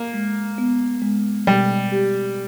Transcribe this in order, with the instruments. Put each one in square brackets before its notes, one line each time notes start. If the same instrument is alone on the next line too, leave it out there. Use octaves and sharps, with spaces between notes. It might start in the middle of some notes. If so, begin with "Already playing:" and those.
Already playing: [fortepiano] A#3
[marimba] G#3
B3
G#3
[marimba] B2 [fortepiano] G3
[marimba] G4